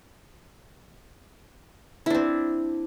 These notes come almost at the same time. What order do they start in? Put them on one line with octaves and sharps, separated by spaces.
E4 D4 C4